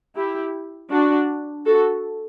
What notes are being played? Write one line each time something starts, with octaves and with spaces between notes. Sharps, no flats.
E4 G4
D4 F#4
F#4 A4